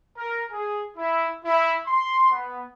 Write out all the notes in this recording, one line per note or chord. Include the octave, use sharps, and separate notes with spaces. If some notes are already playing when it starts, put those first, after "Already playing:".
A#4
G#4
E4
E4
C6
B3